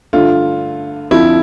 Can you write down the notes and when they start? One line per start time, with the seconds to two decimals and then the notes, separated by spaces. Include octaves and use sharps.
0.13 G2 D3 A3 F4
1.11 F2 D3 F3 C4 E4 F4